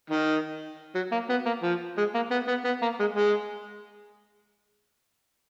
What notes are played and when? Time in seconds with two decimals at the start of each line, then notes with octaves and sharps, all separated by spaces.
0.10 D#3
0.95 F#3
1.12 A#3
1.29 B3
1.46 A#3
1.63 F3
1.98 G#3
2.15 A#3
2.31 B3
2.48 B3
2.65 B3
2.82 A#3
3.00 G#3
3.16 G#3